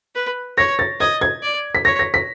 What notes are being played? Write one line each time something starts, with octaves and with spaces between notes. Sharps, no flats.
B4
C#5 A#6
A6
D#5 G#6
G#6
D5
B6
C#5 A#6
A#6
B6